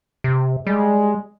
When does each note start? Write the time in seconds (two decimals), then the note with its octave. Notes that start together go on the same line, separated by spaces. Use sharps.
0.24 C3
0.67 G3 G#3